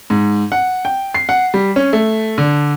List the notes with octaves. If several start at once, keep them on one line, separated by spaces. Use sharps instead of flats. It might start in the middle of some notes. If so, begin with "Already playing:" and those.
G#2
F#5
G5
C7
F#5
G3
C#4
A3
D3